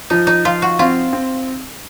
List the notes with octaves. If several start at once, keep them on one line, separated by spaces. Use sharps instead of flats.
F3 D#4
D#4
F3 F4
F#4
C4 F4
C4